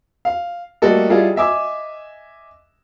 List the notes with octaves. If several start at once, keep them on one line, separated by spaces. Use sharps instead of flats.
F5
G3 A3 A#3 F#4 A4 D#5
G3 E4 F4 G#4 A4 D#5
D#5 E5 G#5 D6 E6